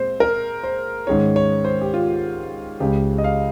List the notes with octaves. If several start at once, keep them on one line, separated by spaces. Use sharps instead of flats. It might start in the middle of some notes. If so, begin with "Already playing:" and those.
Already playing: A#2 G#3 C4 C5
A#4
C5
G#2 D#3 G#3 C#4 C#5
C#5
C5
G4
F4
C#2 C#3 G#3 G4
D#5
F5